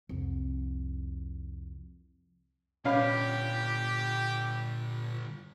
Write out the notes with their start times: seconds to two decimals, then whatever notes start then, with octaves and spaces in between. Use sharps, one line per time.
0.09 C2 F2
2.85 G2 A#2 D3 C#4 G4 F5 B5